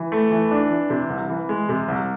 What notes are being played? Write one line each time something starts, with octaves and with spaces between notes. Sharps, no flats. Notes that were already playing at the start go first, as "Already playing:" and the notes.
Already playing: E3
A3
E3
D4
E3
C3
C2
E3
G#3
C3
C2